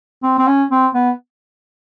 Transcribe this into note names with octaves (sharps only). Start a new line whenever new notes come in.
C4
C4
C#4
C4
B3